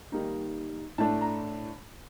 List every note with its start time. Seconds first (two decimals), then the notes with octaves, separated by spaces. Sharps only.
0.12 D#3 G3 A#3 D#4
0.98 A2 A3 D4 A5
1.21 A#5